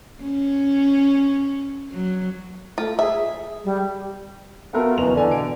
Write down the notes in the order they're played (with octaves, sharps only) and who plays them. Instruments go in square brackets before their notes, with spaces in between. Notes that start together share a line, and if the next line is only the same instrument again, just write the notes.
[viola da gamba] C#4
F#3
[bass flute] A3 [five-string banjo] F4
[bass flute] G#4 [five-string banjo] E5
[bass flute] G#4
G3
[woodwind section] A3 F4 F#4 [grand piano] B3 A4 A#4
[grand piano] F#1 E2 F7 [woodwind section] B2
[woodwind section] D3 [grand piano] E3 G#5
[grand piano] B2 D7